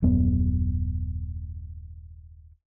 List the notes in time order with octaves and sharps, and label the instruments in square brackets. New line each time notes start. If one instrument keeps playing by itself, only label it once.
[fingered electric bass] D#1 F#2 B3